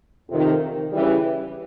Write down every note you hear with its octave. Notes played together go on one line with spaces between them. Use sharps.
F2 C3 D#3
C#3 E3 G3